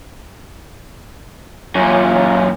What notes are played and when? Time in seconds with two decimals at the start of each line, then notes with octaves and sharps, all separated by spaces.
1.75 F#2 A#2 C#4 F4